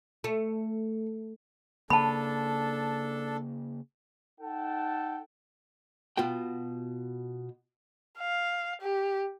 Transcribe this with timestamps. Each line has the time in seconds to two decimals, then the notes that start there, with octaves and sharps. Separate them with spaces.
0.24 A3
1.90 C#3 A#3 D4 A4 A5 B5
4.40 D#4 A4 F#5 G5 A5
6.17 B2 F4 F#4 G5
8.18 F5
8.81 G4